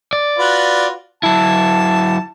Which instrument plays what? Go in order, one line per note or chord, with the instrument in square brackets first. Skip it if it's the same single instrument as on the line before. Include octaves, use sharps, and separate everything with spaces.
[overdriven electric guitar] D5
[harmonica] F4 F#4 B4
[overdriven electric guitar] F#3 E4 [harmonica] A5